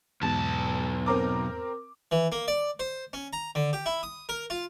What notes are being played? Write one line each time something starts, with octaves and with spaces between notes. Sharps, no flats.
B1 E2 G#2 B2 A5
C4 A#4 D6
E3
A#3
D5
C5
C#4
A#5
D3
G4
E4
D#6
A#4
F4